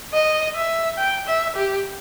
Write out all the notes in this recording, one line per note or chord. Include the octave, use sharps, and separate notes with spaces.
D#5
E5
G5
E5
G4